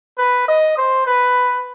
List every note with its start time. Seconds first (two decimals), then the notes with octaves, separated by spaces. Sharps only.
0.18 B4
0.48 D#5
0.77 C5
1.07 B4